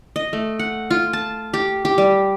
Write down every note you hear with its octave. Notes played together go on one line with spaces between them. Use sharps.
D#5
A3
F#5
F4
A5
G4
G4
G3